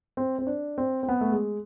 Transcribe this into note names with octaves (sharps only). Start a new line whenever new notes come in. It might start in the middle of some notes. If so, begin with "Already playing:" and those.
C4
C4
D4
C4
C4
B3
A3
G#3